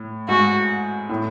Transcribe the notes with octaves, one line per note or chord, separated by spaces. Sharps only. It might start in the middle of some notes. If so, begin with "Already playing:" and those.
Already playing: A2
G#2 F#4
A2